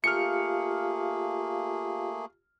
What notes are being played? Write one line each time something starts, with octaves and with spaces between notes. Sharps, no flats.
A3 A#3 F4 G4 G#4 F5 F6 C#7